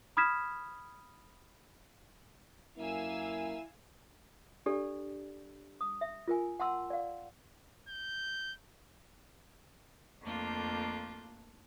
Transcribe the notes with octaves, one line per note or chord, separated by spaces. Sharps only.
B5 D#6 F6 G#6 B6 E7
F#2 A#3 E4 F5 G#5 E6
D4 G4 A4 D5
D#6
E5
F4 A#4 G#5
F#5 A5 C6 E6
D5 F5
G6
F2 A3 A#3 D4 F4 G6